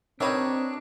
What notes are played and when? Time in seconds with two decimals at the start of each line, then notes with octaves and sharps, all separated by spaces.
0.20 D#3 G3 C4 D4 D#4 B4 C#5 E5